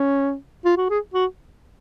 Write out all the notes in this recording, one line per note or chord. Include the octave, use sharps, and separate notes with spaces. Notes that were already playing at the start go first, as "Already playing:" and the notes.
Already playing: C#4
F4
F#4
G#4
F#4